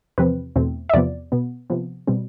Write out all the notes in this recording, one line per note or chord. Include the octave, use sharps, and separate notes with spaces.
E2 C3 F3 C4 B4
E2 B2 A3 C4
E5
E2 C3 F3 B3 D5
B2 B3
C3 F3 B3
B2 G3 C4